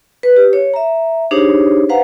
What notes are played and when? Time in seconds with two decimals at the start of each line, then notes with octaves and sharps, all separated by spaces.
0.23 B4
0.36 G4
0.53 C#5
0.74 E5 A#5
1.31 D4 D#4 G4 G#4 C5 C#5
1.89 B4 C5 F5 F#5 A#5